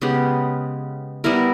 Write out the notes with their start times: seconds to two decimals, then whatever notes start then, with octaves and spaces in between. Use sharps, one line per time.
0.02 C#3 G#3 B3 G4
1.24 G3 B3 E4 A#4